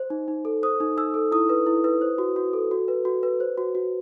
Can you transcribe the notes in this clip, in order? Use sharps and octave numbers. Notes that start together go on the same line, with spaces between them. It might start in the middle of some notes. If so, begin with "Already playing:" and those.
Already playing: C5
D#4
D#4
A4
C5 D#6
D#4
D#4 E6
A4
E4 D#6
B4
E4
B4
C5
F#4
F#4
A4
F#4
B4
F#4
B4
C5
F#4
F#4